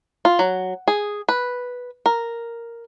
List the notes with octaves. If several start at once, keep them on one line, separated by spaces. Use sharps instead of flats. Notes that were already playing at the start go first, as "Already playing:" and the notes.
F4
F#3
G#4
B4
A#4